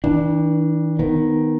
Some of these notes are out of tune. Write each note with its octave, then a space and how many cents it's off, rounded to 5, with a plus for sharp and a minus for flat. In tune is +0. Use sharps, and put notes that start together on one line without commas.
E3 -45 D4 +0
D#3 +0 B3 +0